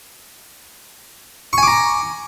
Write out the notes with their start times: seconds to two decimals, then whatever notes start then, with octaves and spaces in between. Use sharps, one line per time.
1.53 C#6
1.58 G#5
1.63 D6
1.67 A#5